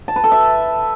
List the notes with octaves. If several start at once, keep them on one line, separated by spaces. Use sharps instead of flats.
A5
B4
A4
E5